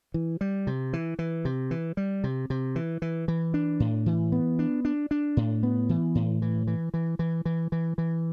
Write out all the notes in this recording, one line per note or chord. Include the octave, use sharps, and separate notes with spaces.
E3
G3
C3
E3
E3
C3
E3
G3
C3
C3
E3
E3
E3
D4
A2
E3
B3
D4
D4
D4
A2
B3
E3
A2
E3
E3
E3
E3
E3
E3
E3